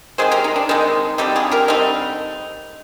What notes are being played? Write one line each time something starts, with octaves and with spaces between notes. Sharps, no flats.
D#3 G#3 C4 G#4 C5
G4 A#4
D#4
D4
D#3 G#3 C4 D#4
D3 G3 C4 D#4 G4
F4 G#4
G4 A#4
D3 G3 C4 D#4